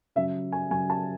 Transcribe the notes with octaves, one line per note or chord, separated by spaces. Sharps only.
C#3 F#3 E5
G#5
C#3 F#3 G#5
A5